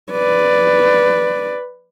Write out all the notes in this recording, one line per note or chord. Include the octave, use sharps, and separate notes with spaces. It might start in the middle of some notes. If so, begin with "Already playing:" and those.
B4 D5